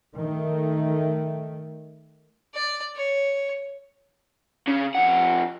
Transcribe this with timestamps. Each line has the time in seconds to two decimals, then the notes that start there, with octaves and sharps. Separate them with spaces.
0.17 D#3 A3
2.54 D5
2.96 C#5
4.68 C#3
4.95 F2 F#5